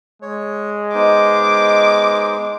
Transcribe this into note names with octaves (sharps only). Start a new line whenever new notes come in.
G#3 C#5
B3 D#4 C5 D#5 D6